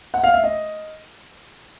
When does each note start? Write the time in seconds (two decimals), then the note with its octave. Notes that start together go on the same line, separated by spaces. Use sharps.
0.14 F#5
0.24 F5
0.34 E5
0.44 D#5